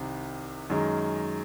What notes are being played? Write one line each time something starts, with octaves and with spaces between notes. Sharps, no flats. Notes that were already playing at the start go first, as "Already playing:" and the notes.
Already playing: C2 C3 D#3
F#2 D#3 G#3